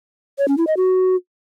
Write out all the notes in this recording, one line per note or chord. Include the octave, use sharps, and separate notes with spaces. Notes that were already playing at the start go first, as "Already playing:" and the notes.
C#5
C#4
E4
D#5
F#4